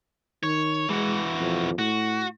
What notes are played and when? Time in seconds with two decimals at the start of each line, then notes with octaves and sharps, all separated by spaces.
0.43 D#3 C#5
0.89 E3 G#3 F#4
1.40 F2
1.79 A2 F#4